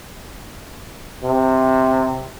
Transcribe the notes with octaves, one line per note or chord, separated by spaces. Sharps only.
C3